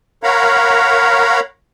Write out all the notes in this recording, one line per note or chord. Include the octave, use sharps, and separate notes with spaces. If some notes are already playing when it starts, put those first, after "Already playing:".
A#4 C#5 F5 F#5 A#5 B5